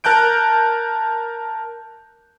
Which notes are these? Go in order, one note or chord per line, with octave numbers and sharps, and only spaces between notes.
A#4 A5 F#6 G6 D7